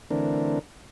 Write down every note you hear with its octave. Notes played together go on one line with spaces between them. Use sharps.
D3 E3 A3 C4 D4 A#4